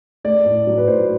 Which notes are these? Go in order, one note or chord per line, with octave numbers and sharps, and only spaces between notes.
A3 D5
A2
F#3
B4
A2 C5